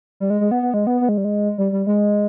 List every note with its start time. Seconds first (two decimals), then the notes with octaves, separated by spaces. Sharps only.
0.20 G3
0.30 G#3
0.41 G#3
0.51 B3
0.63 B3
0.74 G#3
0.87 B3
1.01 B3
1.09 G#3
1.18 G3
1.25 G#3
1.58 G3
1.72 G3
1.87 G#3